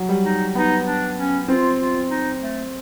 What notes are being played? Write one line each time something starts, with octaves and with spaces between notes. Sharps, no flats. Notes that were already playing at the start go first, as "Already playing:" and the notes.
Already playing: F#3
G3
D#4
B3 D#4
D4
C#4
C4 F4
F4
D#4
A3